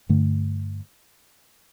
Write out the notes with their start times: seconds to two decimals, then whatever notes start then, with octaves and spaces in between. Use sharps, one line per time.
0.09 G2 D3 A3